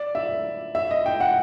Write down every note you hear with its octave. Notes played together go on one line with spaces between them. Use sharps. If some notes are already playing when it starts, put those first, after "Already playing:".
Already playing: D5
E5
E5
D#5
G5
F#5